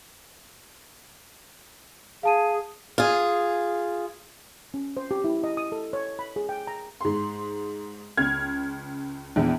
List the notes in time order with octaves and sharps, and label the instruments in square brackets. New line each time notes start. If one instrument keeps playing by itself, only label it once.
[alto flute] G#4 [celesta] F5 A5 D#7
[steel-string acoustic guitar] F4 G#4
[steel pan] C#4
C5
G4
E4
D#5
D#6
A4
C#5
B5
G#4
G5
A#5
[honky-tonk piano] G#2 C6
C#2 F6 G#6
A#1 E2